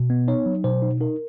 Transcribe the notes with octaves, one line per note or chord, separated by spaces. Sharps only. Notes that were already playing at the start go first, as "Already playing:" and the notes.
Already playing: B2
B3
D#4 C#5
F#3
B2 C5
D#4
D#4 A#4